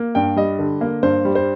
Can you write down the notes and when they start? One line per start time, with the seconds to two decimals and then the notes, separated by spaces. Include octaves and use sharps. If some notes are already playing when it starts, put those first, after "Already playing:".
Already playing: A#3
0.15 G2 G5
0.36 G3 D#5
0.59 D3
0.81 A#3
1.03 G2 C5
1.25 G3
1.35 C5